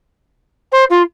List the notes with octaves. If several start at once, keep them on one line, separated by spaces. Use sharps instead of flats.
C5
F4